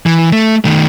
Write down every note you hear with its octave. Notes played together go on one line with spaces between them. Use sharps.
E3
A3
D#3 A3